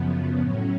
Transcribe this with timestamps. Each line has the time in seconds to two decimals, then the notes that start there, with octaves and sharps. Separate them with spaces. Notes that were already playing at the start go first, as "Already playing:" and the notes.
Already playing: F#2 C#3 F3 B3
0.39 A2 F#3 C#4